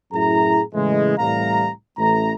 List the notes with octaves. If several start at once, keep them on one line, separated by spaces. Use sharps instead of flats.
F#2 A2 E4 G#4 A#5
A2 C#3 E3 G#3
C2 A2 E3 G3 F5 A#5
A1 A3 A#5